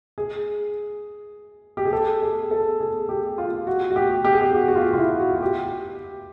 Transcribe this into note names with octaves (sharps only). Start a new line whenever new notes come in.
G#4
G4
G#4
A4
G#4
A4
G#4
G4
F4
F#4
F#4
G4
G4
G#4
G4
F#4
F#4
F4
F4
E4
F#4
F#4
G4